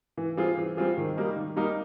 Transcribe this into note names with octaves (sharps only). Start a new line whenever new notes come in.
E3
G3 C4 F4 G#4
E3
G3 C4 F4 G#4
D#3
G3 A#3 D#4
D#3
G3 A#3 D#4